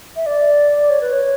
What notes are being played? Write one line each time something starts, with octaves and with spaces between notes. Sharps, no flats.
E5
D5
C#5
B4
C#5